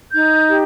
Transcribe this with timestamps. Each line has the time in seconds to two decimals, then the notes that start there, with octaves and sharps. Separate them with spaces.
0.13 D#4 G6
0.50 G4